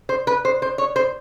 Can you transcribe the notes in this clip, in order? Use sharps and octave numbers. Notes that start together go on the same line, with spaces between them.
C5
B4
C5
C5
C#5
C5